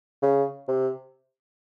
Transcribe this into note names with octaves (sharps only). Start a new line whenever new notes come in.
C#3
C3